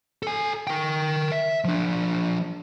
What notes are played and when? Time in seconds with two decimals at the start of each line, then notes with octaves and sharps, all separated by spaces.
0.23 A4 G#5
0.67 A#4 G5
1.32 E5
1.64 F3 D4